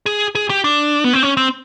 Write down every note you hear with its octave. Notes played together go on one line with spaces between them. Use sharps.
G#4
G#4
G4
D4
B3
C4
C#4
C4